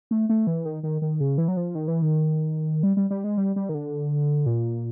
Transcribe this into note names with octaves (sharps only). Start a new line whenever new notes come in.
A3
A3
E3
D#3
D#3
D#3
C#3
E3
F#3
F3
D#3
E3
D#3
G3
G3
G3
G#3
G3
G3
D#3
D3
A#2